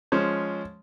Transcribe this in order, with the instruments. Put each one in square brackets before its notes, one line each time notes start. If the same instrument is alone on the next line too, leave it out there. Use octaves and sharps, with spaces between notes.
[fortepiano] F3 G#3 C#4 C5